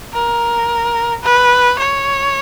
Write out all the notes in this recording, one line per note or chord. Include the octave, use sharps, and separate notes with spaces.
A#4
B4
C#5